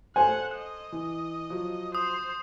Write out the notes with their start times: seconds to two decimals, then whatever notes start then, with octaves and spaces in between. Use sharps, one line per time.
0.16 A4 C5 F#5 G#5
0.55 D#5
0.92 E3
1.50 F3 F#3
1.95 C5 D#6